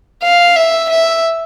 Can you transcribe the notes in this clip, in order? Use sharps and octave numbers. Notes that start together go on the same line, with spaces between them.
F5
E5
E5